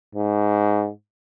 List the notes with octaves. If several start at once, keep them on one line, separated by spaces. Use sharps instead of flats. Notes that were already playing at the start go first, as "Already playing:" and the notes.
G#2